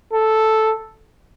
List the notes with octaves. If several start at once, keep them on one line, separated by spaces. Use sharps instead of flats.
A4